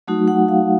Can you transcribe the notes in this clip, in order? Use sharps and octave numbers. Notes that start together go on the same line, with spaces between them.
F#3 A3 D#4 F#4
F#5
F5